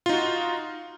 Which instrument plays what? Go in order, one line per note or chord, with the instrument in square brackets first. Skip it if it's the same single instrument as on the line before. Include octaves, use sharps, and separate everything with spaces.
[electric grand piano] F4
D#4
F#4